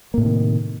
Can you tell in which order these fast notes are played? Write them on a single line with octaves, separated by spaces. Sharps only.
A#3 A2 C3 D#3